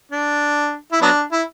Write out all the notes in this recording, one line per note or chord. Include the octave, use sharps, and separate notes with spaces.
D4
E4
F#3 B3 D4
E4